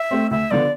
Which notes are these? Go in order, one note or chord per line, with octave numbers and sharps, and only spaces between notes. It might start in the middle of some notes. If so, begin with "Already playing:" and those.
Already playing: E5
A3 C4
D2 E5
D3 F3 B3 D5